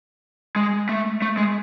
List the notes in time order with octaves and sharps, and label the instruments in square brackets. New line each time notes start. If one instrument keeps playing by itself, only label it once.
[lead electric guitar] G#3
A3
A3
G#3